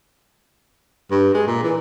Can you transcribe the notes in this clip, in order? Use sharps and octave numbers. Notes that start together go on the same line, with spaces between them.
G2
G#3
A#2
E3